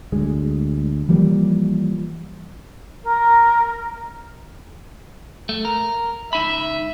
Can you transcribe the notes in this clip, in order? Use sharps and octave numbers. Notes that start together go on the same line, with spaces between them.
D2 G#3
E3 F3 G3 A#3
A#4
A3
A#4
C#2 D#4 E5 B5